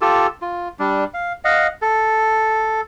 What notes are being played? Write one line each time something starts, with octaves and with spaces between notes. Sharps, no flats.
F4 G4 A4 E6
F4
G3 D4
F5
D#5 F5 F#5
A4